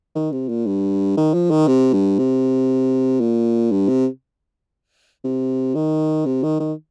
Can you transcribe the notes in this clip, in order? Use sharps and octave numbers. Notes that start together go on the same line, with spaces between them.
D#3
C3
A#2
G2
D#3
F3
D#3
C3
G2
C3
A#2
G2
C3
C3
D#3
C3
D#3
D#3